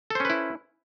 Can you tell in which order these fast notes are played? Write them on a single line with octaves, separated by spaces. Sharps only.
A4 C5 C#4 B4 E4